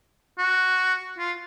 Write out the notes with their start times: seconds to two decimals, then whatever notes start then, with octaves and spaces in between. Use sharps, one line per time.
0.39 F#4
1.18 F4